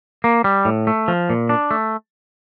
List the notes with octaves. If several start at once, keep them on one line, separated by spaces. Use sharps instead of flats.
A#3
G3
A2
A3
F3
A#2
D4
A3